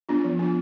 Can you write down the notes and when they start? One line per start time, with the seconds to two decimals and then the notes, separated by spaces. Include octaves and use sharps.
0.09 B3 D4 F4
0.24 F3
0.39 B3 D4 F4